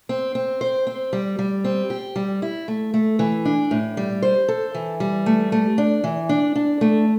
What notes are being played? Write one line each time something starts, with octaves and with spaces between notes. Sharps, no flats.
C4
C4
C5
C4
G3
G3
C4
G4
G3
E4
A3
A3
E3
D4
A2
G3
C5
A4
E3
G3
A3
A3
D4
E3
D4
D4
A3